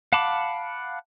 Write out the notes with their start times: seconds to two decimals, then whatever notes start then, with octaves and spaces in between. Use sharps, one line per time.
0.13 F5 F#5 A5 B5 D6